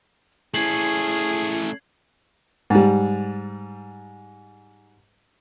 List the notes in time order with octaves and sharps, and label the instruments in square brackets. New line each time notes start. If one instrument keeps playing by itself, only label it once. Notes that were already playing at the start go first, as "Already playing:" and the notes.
[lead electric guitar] A3 C#4 [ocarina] E4 [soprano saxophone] G#4 [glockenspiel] G#6 C7 F#7
[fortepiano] G#2 G3